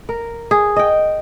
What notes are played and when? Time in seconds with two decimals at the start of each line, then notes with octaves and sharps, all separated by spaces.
0.09 A#4
0.51 G#4
0.76 D#5 G5